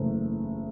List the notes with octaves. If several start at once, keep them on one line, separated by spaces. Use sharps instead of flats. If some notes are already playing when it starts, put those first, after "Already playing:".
Already playing: F#1 E2 A3